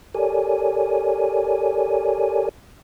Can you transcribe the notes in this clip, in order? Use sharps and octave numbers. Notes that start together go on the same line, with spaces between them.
G4 A4 A#4 C#5 D5 G#5